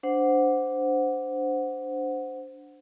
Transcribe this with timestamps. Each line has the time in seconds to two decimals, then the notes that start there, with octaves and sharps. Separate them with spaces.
0.03 D4 C5 F#5